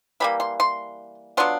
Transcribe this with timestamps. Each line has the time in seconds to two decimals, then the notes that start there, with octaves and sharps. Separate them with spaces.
0.20 E3 G3 A#3 B5
0.40 C6
0.60 C6
1.37 F#3 B3 D4 F4 C6